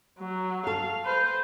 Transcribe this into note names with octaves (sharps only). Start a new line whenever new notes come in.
F#3
A4 F5
B4 C5